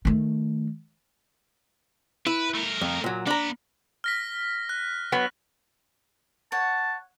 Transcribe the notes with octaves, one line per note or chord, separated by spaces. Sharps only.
D#3 A3
E4 B4
A3 A#4
F2
A#2 F#3
A#3 D4 A#5 B5
F6 A#6 B6
F#6
F#3 B3
C#5 F#5 A5